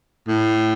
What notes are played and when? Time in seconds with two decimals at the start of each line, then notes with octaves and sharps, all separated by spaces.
0.28 A2